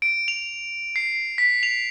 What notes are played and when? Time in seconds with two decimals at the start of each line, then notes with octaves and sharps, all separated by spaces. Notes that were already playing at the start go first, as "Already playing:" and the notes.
0.02 D7
0.28 F7
0.96 C7
1.38 B6
1.63 F7